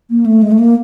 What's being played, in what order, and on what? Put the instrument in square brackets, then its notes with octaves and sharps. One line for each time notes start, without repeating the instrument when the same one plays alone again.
[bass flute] A#3
A3
G#3
A3
A#3